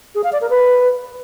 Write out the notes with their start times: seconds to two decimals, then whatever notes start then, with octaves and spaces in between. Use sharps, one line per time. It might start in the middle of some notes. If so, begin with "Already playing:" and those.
0.15 G#4
0.24 F5
0.32 D5
0.41 A#4
0.50 B4